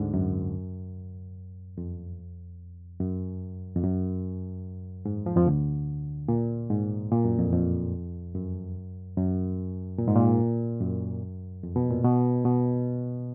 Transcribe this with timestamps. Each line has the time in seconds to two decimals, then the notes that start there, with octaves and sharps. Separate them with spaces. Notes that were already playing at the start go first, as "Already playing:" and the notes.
Already playing: D2 G#2 D3
0.14 F#2
1.78 F2
3.00 F#2
3.76 F2
3.83 F#2
5.05 G#2
5.26 F2 F3
5.36 F2 F3
5.46 D2 D3
6.28 A#2
6.70 G#2
7.12 A#2
7.24 F#2
7.38 F2
7.53 F2
8.35 F#2
9.17 F#2
9.98 A#2
10.08 G#2
10.15 A#2
10.81 F#2
11.63 F2
11.76 B2
11.90 A#2
12.04 B2
12.45 B2